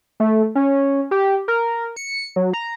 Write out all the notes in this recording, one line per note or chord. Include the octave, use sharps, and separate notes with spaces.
A3
C#4
G4
A#4
C#7
F#3
A#5